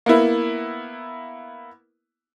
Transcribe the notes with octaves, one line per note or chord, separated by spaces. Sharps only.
A#3 B3 E4